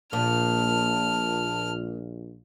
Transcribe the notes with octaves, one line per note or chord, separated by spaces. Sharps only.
A#1 A#2 A5 F6